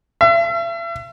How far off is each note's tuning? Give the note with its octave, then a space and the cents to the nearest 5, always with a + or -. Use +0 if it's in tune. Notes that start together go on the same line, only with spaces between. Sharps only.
E5 +40